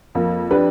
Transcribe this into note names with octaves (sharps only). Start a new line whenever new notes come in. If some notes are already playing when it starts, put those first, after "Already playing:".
F2 A#3
D4 G4 B4